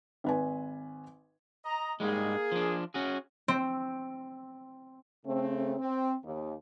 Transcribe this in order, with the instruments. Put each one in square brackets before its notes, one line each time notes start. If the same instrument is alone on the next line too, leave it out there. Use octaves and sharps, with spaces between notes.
[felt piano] G#1 B4 G#5
[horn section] D#5 A#5
[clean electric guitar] G#2 G3 G#3 [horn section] A#3 G#4
[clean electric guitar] F3 D4
C#4 F#4 G#4
[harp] C4
[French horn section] C#3 A3 C4
C4
D#2